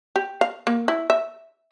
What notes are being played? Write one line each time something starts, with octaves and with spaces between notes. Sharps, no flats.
G4
F5
A#3
E4
E5